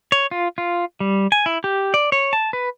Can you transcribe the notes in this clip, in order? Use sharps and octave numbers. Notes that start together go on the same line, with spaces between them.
C#5
F4
F4
G3
G#5
E4
G4
D5
C#5
A5
B4